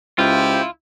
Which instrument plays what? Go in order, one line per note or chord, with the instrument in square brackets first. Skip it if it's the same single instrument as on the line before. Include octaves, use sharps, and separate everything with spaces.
[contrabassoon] C#2 [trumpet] E4 [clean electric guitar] F4 [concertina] G4 C5 G5